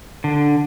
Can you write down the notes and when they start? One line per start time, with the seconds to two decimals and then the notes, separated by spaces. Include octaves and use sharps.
0.24 D3